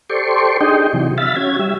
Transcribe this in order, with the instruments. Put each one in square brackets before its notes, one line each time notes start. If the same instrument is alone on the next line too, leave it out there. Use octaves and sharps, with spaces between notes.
[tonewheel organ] G4 A4 C5 D5 C6 C#6
D4 D#4 G4 G#4 D#5 G5
C3 E3 F#3
E5 F5 B5 A6
C#4 F#4 G#6
G3 E5